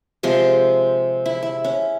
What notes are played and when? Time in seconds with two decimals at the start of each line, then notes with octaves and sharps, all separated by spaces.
0.23 C3 F3 G#3 C6
1.26 E4
1.43 E4
1.64 C#4